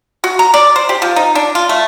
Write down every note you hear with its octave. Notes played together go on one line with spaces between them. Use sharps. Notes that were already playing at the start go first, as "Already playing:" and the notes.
F#4
A#5
D5
C5
G4
F3
D#4
D4
F4
A3